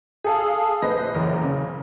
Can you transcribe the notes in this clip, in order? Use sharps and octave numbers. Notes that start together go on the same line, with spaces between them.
G#4 A4 F5
A#1 B4 C5 D#5 A#6
F#1 E2 A#4 C#5
C#3